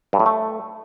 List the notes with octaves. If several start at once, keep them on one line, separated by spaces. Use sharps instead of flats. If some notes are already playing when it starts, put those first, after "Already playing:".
G2
A2
A3